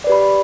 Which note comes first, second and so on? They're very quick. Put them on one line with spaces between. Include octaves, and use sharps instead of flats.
D5 B4 G4 B5